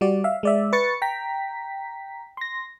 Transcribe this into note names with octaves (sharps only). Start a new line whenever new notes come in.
G3 F#4 D5
E5 F5
G#3 D5 E5
B4 C#6 A6 C#7
G5 A#5 B6
C6 A#6